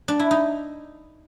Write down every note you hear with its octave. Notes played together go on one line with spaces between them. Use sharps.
D4
E4
D#4